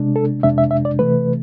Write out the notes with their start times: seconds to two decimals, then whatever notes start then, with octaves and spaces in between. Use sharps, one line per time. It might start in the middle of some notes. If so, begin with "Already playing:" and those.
Already playing: C3 G#3 D4
0.16 A4
0.43 F2 C3 G#3 D4 E5
0.58 E5
0.71 E5
0.85 D5
0.99 C3 E3 A3 B4